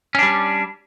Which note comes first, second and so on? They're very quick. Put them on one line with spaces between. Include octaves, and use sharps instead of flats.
C#4 D4 G3